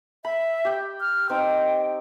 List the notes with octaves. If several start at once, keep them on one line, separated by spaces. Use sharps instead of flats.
E5 B5
G4 G5
F6
C4 D#4 G5